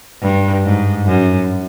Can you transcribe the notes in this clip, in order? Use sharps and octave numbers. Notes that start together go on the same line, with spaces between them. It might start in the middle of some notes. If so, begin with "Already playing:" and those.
G2
G#2
F#2